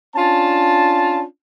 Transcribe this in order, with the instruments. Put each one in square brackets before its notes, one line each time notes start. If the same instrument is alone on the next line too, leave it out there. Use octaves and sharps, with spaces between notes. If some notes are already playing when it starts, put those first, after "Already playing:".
[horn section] C#4 D4 F4 A5